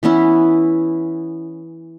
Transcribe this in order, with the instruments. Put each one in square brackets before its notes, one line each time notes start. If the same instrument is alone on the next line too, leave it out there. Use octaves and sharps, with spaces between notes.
[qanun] E3 B3 C#4 E4